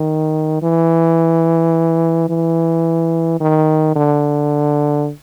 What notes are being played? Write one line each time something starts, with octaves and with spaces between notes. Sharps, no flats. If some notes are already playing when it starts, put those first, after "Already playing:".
Already playing: D#3
E3
E3
D#3
D3